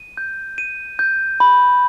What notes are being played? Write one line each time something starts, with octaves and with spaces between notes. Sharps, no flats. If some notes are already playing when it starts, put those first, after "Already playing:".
Already playing: D#7
G6
D#7
G6
B5